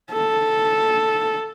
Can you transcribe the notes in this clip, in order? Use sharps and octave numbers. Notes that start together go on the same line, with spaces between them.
A4